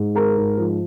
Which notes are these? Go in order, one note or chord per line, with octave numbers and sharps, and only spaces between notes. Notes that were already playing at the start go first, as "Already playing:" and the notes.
Already playing: G#2
G#3 A#4
G#2
F3